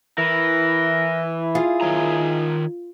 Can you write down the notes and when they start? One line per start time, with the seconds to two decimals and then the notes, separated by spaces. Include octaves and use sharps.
0.18 E3 E4 A#4
1.55 F4 G#4
1.81 D#3 C#5 A#5